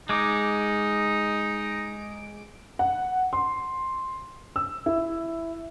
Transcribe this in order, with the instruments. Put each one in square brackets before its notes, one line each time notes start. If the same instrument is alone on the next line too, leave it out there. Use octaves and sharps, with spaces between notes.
[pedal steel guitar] G#3 D6 [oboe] D#4
[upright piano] F#5
C6
E6
E4